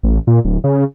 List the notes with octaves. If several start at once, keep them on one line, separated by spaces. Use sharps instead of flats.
A1
A#2
D1
C#3